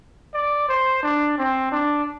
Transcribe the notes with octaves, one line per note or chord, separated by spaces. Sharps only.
D5
C5
D4
C4
D4